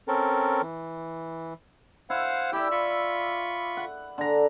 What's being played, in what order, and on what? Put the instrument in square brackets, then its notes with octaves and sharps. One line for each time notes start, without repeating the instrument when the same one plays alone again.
[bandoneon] C4 C#4 A4 A#4
E3
[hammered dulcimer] E4 [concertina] C5 F5 F#5
[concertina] E4 G4 G5 [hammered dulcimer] D5 E5
[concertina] F4 B5 C#6
[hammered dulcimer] F#5
D3 A#5